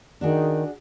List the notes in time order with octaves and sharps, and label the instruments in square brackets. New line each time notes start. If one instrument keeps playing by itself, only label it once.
[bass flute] D#3 [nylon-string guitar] D4 F#4 G#4